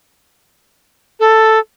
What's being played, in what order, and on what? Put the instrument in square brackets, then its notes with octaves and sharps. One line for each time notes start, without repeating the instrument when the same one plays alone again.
[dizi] A4